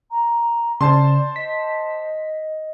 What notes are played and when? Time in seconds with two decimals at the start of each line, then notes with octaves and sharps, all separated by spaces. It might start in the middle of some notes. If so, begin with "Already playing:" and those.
0.11 A#5
0.81 C#3 C5 D5 A5 C6
1.36 D#5 B6